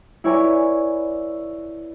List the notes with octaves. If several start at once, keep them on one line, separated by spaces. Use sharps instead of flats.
E4 B4 C#5 D5 G#5 A#5